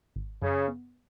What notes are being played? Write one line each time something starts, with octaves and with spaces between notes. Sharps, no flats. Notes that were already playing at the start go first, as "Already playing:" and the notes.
G#1
F#2 C#3
B3